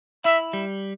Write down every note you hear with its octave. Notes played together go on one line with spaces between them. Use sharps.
E4 E5
G3